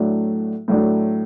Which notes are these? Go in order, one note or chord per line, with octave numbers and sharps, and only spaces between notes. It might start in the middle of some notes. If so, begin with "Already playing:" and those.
Already playing: A2 F#3 A3 D4
A2 F#3 A3 D4